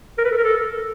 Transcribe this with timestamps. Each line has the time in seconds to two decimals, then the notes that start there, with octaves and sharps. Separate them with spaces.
0.18 A#4
0.25 B4
0.31 A4
0.37 A#4
0.44 A4